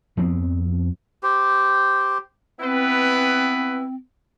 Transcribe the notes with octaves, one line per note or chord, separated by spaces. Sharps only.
F2 F3 B3 C4
G4 C5
B3 C4 E4 B4